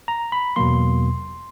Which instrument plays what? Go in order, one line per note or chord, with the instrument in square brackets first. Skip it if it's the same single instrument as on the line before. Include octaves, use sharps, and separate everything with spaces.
[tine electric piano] A#5
B5
E2 B2 F#3 A#3 C6